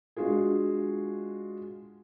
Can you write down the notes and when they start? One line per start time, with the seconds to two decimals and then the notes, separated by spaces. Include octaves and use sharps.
0.16 G#3 D4 F4 F#4 G#4